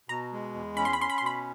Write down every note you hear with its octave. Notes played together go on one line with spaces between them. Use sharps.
B2 A#5
G#3
E2
C#4 B5
C6
B5
C#4 C6
B5
C6
B2 B5